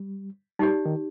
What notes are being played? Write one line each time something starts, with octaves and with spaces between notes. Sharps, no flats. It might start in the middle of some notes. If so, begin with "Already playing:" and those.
Already playing: G3
G3 D#4 G4 D5
D#3